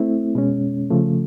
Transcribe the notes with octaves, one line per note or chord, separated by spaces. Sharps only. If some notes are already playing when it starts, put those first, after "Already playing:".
Already playing: A3 C4 E4
B2 G#3 C#4
C#3 F3 A3